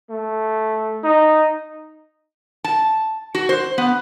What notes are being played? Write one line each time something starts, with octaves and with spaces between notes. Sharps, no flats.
A3
D#4
A5
F#4
C5
B3